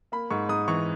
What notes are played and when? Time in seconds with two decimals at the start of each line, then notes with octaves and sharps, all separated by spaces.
0.12 A#3 B5
0.30 G#2 C#6
0.49 G#2 D#6
0.68 E3 C#6